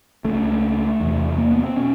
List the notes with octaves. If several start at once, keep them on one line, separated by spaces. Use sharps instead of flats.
C#2 C#3 A3
E2 C3
A#3
B3
C4
B2 C#4